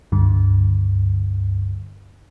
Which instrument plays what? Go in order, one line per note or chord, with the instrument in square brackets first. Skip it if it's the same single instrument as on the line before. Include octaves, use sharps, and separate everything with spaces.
[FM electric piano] C#2 G2 D3